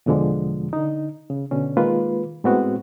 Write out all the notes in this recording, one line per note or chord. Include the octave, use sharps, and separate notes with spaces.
E2 B2 D3 F3 G#3
D3 D#4
C#3
B2 D3 C#4
D#3 G#3 A#3 F4 B4
A2 G#3 B3 C4 F#4